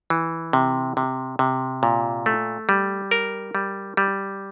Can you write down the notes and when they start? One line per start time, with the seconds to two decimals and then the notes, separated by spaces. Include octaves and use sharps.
0.10 E3
0.53 C3
0.97 C3
1.39 C3
1.83 A#2
2.26 A3
2.69 G3
3.11 A#4
3.55 G3
3.97 G3